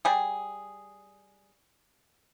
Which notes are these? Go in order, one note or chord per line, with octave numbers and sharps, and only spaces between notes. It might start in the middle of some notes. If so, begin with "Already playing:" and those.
G3 G#4